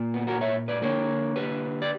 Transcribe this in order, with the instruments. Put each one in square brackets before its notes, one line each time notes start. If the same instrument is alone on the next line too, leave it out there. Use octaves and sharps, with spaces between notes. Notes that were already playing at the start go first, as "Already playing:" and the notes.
Already playing: [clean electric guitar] A#2 A#3
B3
F#4 A#4
C#5 E5
B4 D5
D3 A#3 A#4 C#5
G4 B4
D5